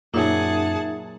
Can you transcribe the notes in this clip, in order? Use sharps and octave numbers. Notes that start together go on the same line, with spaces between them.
F#2 A#2 F#3 D#4 G#4 E5 F#5 A5